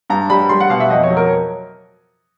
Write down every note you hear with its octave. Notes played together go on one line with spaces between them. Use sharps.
G2 A#5
G3 B5
G3 C6
F#5
B2 F5
E5
F2 D#5
C#5
F#3
A#4